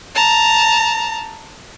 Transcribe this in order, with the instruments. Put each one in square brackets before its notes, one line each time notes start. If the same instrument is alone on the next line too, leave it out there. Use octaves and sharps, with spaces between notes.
[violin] A5 A#5